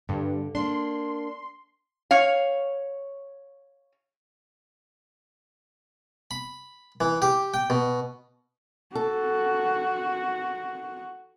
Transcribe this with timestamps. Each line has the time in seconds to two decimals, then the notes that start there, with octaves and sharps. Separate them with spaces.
0.09 G2 D3
0.55 A#3 D4 C6
2.11 C#5 F5
6.31 B5
7.00 E3
7.22 G4
7.54 G5
7.70 B2
8.95 F#4 A4